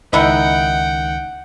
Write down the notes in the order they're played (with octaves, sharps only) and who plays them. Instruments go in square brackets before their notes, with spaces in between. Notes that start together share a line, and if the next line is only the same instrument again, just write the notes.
[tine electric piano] C#2 D#3 B6 [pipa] D#4 E4 D#5 [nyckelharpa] F#5 G5